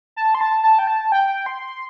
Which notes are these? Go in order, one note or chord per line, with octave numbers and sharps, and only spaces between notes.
A5
C6
A5
A5
G5
A5
G5
C6